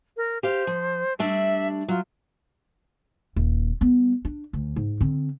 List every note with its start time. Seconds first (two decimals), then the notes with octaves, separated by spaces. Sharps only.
0.17 A#4
0.43 G4 C5 F5
0.67 F3
1.19 G3 A3 D4 E5
1.88 F#3 F4
3.36 D#1
3.81 G3 B3
4.25 D4
4.53 D2
4.76 G#2
5.01 D3 C4